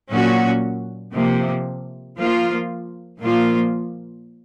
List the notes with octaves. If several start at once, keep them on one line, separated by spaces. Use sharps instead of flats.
A#2 F#3 C#4 F#4
C3 F3 A#3
F3 A#3 F4
A#2 F3 A#3 F4